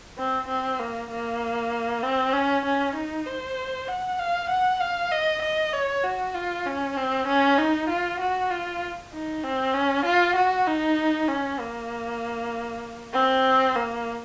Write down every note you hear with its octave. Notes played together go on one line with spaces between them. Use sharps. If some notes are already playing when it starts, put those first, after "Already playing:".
C4
C4
A#3
A#3
C4
C#4
C#4
D#4
C5
F#5
F5
F#5
F5
D#5
D#5
C#5
F#4
F4
C#4
C4
C#4
D#4
F4
F#4
F4
D#4
C4
C#4
F4
F#4
D#4
C#4
A#3
C4
A#3